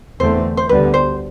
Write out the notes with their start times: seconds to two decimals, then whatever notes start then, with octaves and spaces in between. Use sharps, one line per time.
0.20 E2 D3 A3 C4 C5
0.57 C5
0.69 D2 D3 G3 B3 B4
0.94 C5